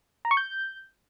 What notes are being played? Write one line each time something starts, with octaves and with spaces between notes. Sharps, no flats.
A#5
C#6
G6